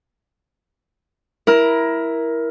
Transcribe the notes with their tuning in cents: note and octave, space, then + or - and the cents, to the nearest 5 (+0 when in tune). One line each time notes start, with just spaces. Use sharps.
E4 +0 A#4 +15